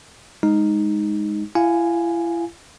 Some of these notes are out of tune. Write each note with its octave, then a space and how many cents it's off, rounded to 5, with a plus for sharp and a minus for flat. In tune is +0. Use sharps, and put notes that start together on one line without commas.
G#3 +0 D#4 +0
E4 +40 F5 +15 G#5 +0